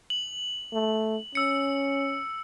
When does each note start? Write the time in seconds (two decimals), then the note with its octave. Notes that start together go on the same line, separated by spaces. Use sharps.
0.10 F#7
0.73 A3
1.35 C#4 E6 C#7